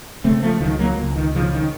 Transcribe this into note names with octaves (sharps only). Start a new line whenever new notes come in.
C#3 A3 C4
F3 A3
C#2 D#3 F#3
F#3 A#3
C#2
D#3
C#3 F3
D#3